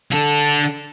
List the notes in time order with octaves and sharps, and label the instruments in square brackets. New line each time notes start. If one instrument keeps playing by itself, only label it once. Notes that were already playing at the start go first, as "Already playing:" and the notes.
[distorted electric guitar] D3 A4